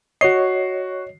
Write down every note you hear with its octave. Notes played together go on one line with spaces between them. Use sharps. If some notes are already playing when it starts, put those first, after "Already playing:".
F#4 C#5 D#5 C7